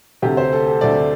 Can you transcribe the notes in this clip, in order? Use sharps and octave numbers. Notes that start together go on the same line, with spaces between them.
D2 C3 A3 G4
C5
A4
A4
D2 C3 A3 D5